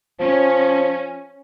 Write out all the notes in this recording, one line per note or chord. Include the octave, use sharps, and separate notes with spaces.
F3 C#4